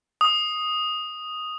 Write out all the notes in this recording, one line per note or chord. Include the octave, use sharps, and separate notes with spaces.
D#6